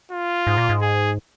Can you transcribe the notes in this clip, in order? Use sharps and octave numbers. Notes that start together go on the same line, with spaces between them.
F4
G#2
A#2
G#2
G#4